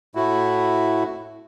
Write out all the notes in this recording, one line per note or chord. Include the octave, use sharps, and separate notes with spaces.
A2 A3 E4 F#4